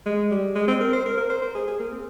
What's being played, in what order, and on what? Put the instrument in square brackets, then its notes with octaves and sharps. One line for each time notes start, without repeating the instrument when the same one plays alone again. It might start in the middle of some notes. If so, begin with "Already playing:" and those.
[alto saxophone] G#3
G3
G#3
C4
A#4
C5
A#4
A#4
C5
C5
G#4
G#4
A#3
C4